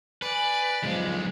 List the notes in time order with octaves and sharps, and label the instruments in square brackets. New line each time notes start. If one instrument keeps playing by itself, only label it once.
[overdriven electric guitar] B4 [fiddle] D5 [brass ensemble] G#5
[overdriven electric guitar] B1 G#3 [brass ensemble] F3